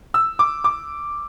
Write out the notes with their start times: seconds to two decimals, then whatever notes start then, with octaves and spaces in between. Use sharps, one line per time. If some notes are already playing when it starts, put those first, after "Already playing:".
0.14 E6
0.39 D6
0.64 D6